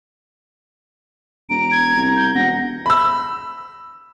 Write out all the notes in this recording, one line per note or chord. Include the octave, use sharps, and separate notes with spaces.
E1 A#5 D7
G#6
C2
G6
E1 F#5 A#6
B5 E6